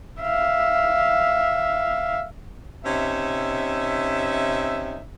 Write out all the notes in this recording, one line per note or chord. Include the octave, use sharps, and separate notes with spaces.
E5 F5
C3 C#4 D#4 E5